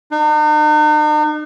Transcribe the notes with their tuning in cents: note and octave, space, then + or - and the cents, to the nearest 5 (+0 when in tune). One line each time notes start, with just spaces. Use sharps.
D#4 -45